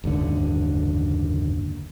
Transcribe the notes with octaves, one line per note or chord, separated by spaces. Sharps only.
F#1 D#2 G#2 D3